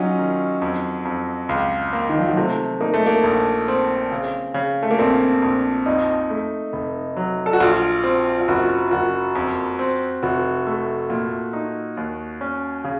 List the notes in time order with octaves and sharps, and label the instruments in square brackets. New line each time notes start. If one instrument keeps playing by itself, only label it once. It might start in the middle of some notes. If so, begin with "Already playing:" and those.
Already playing: [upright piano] F#3 C#4 D#4 F4
[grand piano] D#3
F2
F2
C#2
A#3
[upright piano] D#3
F3
F#3
[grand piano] C3 [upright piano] A3
[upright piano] A#3 [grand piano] D#4
[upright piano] A3
A#3
[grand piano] A#1
C4
C#3
C#3
[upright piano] A3
A#3
[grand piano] A#1 [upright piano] C4
[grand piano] A#1
[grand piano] F2 [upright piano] D#4
[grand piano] A3
F1
F#3
[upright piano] A4
F#4
[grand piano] A#1 [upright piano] F4
[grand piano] C4
[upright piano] F4
[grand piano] F#1 [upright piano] F#4
[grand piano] F#1 [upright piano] F#4
[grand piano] F2
C4
[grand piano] F1 [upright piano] F#4
[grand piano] A3
A#2
D#4
D#2
C#4
C#3